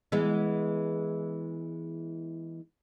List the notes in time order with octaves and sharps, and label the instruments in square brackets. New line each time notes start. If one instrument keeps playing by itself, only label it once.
[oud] E3 G#3 B3